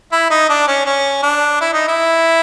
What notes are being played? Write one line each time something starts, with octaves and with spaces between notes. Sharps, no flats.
E4
D#4
D4
C#4
C#4
D4
E4
D#4
E4